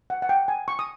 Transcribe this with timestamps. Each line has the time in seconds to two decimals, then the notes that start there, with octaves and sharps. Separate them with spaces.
0.10 F#5
0.22 F#5
0.29 G5
0.48 G#5
0.68 C#6
0.79 D#6